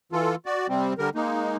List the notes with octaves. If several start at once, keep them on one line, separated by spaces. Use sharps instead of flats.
E3 F4 A4
F#4 D5
C3 G3 C4
D3 G3 A#4
G#3 A#3 D#4